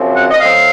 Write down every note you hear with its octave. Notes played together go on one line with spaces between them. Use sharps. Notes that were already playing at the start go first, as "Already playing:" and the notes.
Already playing: F#2 C#3 F3 C4
F#5
D#5
A2 F#3 C4 F5